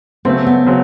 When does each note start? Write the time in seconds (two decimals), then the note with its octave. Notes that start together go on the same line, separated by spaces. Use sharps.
0.25 C#3 F#3 A3 B3 C4
0.46 B3
0.66 C#3 F#3 C4